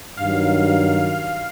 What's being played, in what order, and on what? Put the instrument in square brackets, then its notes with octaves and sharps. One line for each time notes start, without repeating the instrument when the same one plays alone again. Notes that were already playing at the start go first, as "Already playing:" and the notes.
[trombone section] G2 D#3 F#3 [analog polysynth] F5